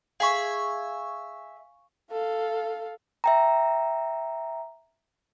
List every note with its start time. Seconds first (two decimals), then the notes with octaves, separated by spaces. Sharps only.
0.20 G#4 E5 F5 G#5 C#6
2.12 A4 F5
3.24 E5 G5 A#5